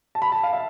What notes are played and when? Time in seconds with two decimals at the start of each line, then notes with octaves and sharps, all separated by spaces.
0.15 A5
0.22 B5
0.32 A5
0.43 F5
0.53 E5